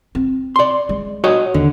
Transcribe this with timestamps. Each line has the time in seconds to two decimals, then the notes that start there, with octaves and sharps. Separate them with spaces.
0.15 C4
0.56 D5 C6
0.89 G#3
1.24 F#4 C#5 D#5
1.54 D#2 D3